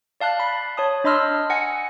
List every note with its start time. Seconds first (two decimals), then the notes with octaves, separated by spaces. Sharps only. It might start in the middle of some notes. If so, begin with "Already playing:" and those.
0.20 D5 F5 A5 F#6
0.40 B5
0.77 C#5 A5 D#6
1.04 D4 D#5 B5 C6 E6 F6
1.50 F#5 G#5 A#6 C#7